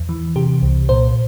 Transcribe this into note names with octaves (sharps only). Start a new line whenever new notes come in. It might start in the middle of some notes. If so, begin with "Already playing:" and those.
Already playing: E2
E3
C3 G4
C2
A#2 C5